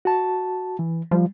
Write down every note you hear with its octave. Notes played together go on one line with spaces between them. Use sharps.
F#4 A5
E3
F3 G3